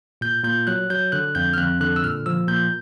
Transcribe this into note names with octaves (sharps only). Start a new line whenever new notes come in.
A#2 G6
A#2 G6
F#3 F#6
F#3 G6
D3 F#6
F2 G6
F6
F2 F#6
D3 F#6
E6
A#2 F6
F3 E6
A#2 G6